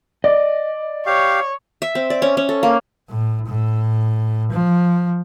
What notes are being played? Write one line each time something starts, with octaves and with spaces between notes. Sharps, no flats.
D5 D#5
G4 C#5 F5
E5
C4
D5
C#4
C#4
A4
A#3
A2
A2
F3